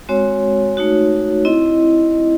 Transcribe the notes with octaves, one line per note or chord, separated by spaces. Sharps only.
G#3 C4 F#4 C#5
A3 D#4 F#4
C4 E4 D#5